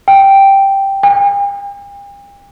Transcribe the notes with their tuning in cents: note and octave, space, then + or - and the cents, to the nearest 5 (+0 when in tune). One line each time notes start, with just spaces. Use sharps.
G5 +0
G5 +45